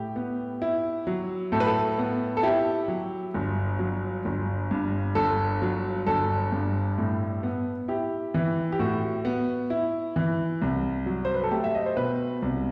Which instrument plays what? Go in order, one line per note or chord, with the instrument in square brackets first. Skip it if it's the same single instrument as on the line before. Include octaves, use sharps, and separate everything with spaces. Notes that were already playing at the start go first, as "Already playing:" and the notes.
Already playing: [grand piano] A2 G4
B3
E4
F#3
A2 A4
B4
A4
B3
A4
E4 G4
F#3
G1
F#3
G1
G2
G1 A4
F#3
G1 A4
G2
A2
B3
E4 G4
E3
G4
A2 F#4
B3
E4
E3
C2
F#3
C5
B4
A4
A3 G4
E5
D#5
C5
B2 B4
C2